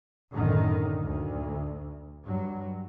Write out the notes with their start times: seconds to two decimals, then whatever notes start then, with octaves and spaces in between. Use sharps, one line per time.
0.33 B1 F#2 A2 D3 D#3
1.04 D2
2.25 G2 F#3